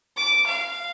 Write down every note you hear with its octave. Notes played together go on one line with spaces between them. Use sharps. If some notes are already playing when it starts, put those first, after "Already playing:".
D6
F5